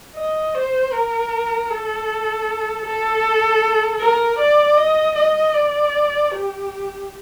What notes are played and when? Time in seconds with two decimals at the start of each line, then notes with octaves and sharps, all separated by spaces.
0.16 D#5
0.55 C5
0.93 A#4
1.70 A4
2.85 A4
4.00 A#4
4.39 D5
4.78 D#5
5.16 D#5
5.54 D5
6.32 G4